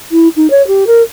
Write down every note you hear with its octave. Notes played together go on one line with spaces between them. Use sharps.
E4
D#4
C#5
G4
A#4